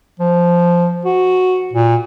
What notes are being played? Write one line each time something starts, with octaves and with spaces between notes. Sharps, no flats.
F3
F#4
A#2